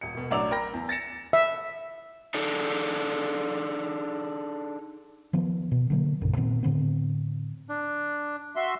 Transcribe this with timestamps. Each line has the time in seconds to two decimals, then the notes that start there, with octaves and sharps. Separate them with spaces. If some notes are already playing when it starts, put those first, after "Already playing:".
0.01 D#1 C#7
0.15 E1 B2
0.31 A1 F#3 D4 D5 E6 F7
0.51 A#4 G5 B5 A#6
0.73 E2
0.89 A6 A#6 C#7 E7
1.33 E5
2.34 D4 D#4 G#4 A4
5.33 D#3 F3 B3
5.72 B2
5.90 D3 F#3 A#3
6.21 A#1 F#2 A#2 C#3
6.36 A#2 D#3 B3 C4
6.63 A2 D3 B3 C4
7.69 D4
8.56 F#4 E5 C6